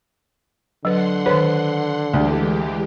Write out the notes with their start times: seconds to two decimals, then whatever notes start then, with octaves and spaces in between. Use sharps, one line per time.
0.85 D3 F#3 B4 F#5 C6
1.26 D#3 B4 C#5
2.13 D2 E3 G#3 G4